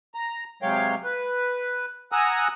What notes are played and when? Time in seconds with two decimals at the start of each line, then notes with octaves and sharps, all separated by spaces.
0.14 A#5
0.62 C3 F#3 G#3 C#5 F5 G5
1.04 B4
2.12 F#5 G#5 A#5 D#6 E6 F#6